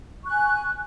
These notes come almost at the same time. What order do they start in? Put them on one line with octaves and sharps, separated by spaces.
C#6 F#6 G#5